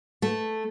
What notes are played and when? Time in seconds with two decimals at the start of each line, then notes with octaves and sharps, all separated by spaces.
0.22 A3